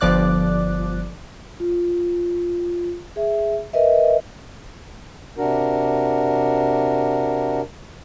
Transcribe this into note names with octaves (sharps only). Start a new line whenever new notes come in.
G1 F3 D5 D6 F#6
F4
G#4 E5
A#4 B4 D#5 E5
C3 D4 F#4 A#4